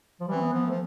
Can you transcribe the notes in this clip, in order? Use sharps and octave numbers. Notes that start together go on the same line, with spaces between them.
F3
E3 G3
C4
B3
F3 B3
F3 A3